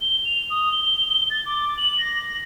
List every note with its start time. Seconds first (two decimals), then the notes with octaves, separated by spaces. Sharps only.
0.01 G7
0.25 F7
0.50 D#6
0.71 G7
1.30 A6
1.46 D6
1.77 F#7
1.99 A#6